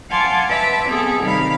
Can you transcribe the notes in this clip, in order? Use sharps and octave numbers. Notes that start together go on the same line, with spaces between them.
F5 F#5 G#5 A5 C6 D6
B4 E5 A5 B5 D6 E6
B3 C4 G#4 A4
C3 D#3 G3 F5 B5